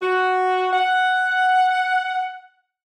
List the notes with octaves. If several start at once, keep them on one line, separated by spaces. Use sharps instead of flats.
F#4
F#5